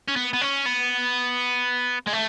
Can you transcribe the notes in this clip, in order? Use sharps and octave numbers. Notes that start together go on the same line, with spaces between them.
C#4
B3
B3
C#4
B3
G#3
A3